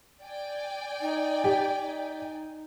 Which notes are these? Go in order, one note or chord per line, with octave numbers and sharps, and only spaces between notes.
D5 G5 G#5
D#4
G4
D#4